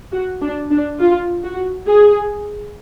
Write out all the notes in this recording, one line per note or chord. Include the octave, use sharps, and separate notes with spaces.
F#4
D4
D4
F4
F#4
G#4